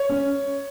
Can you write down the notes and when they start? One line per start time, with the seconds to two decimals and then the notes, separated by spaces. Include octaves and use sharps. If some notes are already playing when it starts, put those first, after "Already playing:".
Already playing: C#5
0.09 C#4